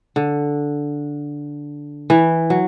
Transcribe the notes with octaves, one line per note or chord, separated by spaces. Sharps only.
D3
E3
F#3